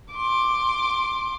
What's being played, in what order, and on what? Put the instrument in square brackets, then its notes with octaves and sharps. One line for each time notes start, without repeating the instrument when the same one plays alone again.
[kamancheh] C6 D6